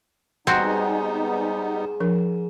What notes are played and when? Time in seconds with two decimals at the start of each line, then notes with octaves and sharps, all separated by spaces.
0.47 G#2 G3 B3 C4 D#4 F#4
2.00 F3 D4 A#4